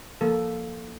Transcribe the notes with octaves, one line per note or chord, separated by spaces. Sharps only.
F3 A#3 A4